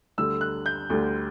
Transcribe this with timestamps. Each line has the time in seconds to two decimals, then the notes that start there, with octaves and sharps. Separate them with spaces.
0.18 D2 D3 G3 E6
0.41 F#6
0.66 G6
0.90 D2 D3 G3